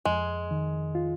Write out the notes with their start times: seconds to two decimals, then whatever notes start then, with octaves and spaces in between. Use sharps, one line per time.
0.05 F2 G#3
0.51 D#3
0.95 F4